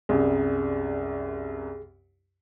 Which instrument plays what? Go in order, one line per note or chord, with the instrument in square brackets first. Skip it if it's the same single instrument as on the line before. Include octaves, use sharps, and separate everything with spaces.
[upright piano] C2 F#2 G3 [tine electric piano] G#4